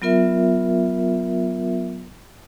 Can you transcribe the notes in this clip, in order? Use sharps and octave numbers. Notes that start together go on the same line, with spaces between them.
F#3 B3 F4 A#4 E5